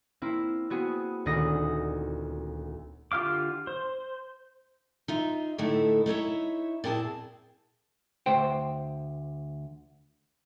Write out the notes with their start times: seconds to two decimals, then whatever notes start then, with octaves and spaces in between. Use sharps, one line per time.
0.22 A#3 C4 E4
0.70 B3 C4 F#4 G#4
1.26 D#1 D2 D#3 F#5 D#6 A#6
3.12 D3 F4 G4 F5 D6
3.67 C5
5.08 D#4 F4 E5
5.58 A2 D3 A3 D#4 E4
6.06 D#4 E4 C#5 E5
6.84 A#2 C4 E4 G#4 A5
8.26 D2 C5 G5